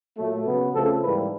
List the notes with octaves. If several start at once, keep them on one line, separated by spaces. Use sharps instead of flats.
A#2 F#3 A3
C#3 F#3 B3
C#3 F3 A3 C4 A4
G#2 E3 G3 A#3 B4